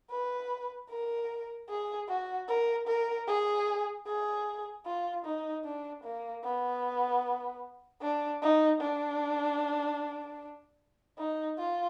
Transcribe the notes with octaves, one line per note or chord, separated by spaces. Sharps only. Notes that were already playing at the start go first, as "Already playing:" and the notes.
B4
A#4
G#4
F#4
A#4
A#4
G#4
G#4
F4
D#4
D4
A#3
B3
D4
D#4
D4
D#4
F4